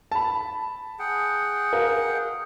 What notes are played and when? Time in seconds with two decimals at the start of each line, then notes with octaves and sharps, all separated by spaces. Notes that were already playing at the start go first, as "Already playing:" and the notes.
0.12 A5 B5
0.99 G#4 F#5 G5
1.73 A#4 F5